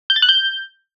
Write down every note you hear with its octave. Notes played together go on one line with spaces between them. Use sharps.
G6
A6
F#6
G6